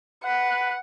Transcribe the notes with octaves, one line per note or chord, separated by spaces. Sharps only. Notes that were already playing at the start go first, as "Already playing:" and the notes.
B4 F#5